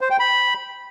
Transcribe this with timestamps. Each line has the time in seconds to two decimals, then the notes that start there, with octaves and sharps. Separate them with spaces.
0.01 C5
0.10 G5
0.19 B5